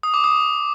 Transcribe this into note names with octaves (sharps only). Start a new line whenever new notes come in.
D#6
D6
D#6